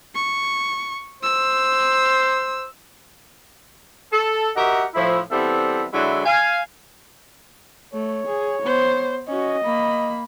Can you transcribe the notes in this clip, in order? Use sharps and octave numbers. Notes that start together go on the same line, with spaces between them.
C#6
C5 E6
A4
F#4 G4 A#4 D#5 E5 F#5
A2 F3 E4
E3 G3 B3 C4 A4 E5
D3 F#3 G#3 E4
F5 G#5
A3 C#5
G#4
B3 C5
C#4 F#4 D#5
A#3 B5